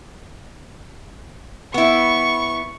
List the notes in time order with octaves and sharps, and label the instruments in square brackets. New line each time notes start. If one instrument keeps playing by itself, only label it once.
[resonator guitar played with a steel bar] B3 E4 [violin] C#6